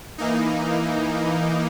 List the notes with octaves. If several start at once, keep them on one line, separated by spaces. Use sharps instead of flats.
E3 A#3 D#4